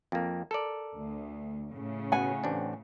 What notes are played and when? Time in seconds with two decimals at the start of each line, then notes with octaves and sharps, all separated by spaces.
0.12 F2 A#3
0.51 A4 A#4 D5
0.97 D2
1.71 A2 C#3
2.12 B2 F#5 G#5
2.44 A1 C4 D4